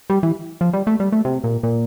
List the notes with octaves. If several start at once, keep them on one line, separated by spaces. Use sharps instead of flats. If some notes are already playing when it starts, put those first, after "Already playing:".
G3
E3
F3
G3
A3
G3
A3
C3
A#2
A#2